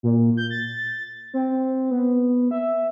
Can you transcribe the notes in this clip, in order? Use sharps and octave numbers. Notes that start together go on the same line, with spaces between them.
A#2
G6
A6
C4
B3
E5